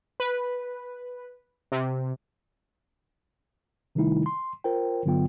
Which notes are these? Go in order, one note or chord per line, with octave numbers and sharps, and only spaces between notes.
B4
C3
C3 D#3 G3 A3 D#4 E4
C6
F4 A#4 C5 G5
G2 D3 F#3 B3 F4 G5